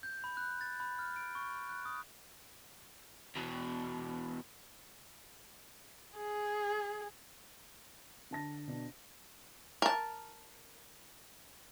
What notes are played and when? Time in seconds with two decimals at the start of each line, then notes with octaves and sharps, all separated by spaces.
0.03 G6
0.24 B5
0.37 F#6
0.61 A6
0.80 B5
0.99 F6
1.16 D7
1.35 C#6
1.49 B5
1.69 F#6
1.85 D#6
3.36 E2 B2
6.18 G#4
8.31 D3 A5 A#6
8.68 B2 D4
9.82 A#4 A5